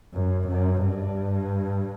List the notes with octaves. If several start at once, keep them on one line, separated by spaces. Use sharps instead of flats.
F#2
F#2
G2